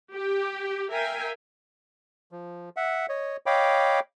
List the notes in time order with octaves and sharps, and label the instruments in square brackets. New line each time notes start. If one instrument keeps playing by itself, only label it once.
[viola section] G4
A#4 E5 F5 G5 G#5
[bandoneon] F3
E5 F#5
C#5 D#5
C#5 D#5 F5 G5 B5 D6